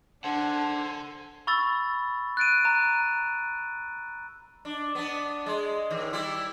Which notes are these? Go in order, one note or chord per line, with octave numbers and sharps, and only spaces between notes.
D4 A4 C5 F#5 G#5 A5
B5 C#6 E6 A6
F#6 A6 D7 D#7
A#5 F#6
A#5
D4
B3 D4
G#3
A2 D#3
G3 E4